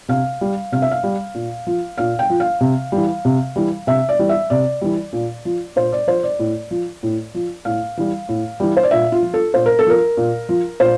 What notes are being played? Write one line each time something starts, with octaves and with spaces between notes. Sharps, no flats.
C3 F5
G3
C3 F5
E5
F5
G3
A#2
F3
A#2 F5
G5
F3
F5
C3
E3 G3
C3
E3 G3
C3 E5
D5
E3 G3
E5
C3 D5
E3 G3
A#2
F3
A#2 C5
D5
F3 C5
D5
A2
F3
A2
F3
A2 F5
E3 G3
A2
E3 G3
C5
D5
A#2 E5
F4
F3
A4
A#2 C5
A#4
A4
F3 A#4
A#2
F3
A#2 C5